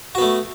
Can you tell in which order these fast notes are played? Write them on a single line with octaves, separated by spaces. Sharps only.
F#4 B3 A3